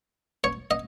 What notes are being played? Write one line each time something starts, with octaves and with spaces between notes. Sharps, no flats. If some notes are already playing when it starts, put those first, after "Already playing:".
C#5
D#5